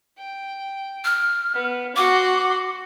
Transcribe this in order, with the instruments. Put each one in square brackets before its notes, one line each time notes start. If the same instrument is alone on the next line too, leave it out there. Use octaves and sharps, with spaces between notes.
[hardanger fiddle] G5
[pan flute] F6
[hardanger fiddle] B3
[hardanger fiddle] F#4 C6 [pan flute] D6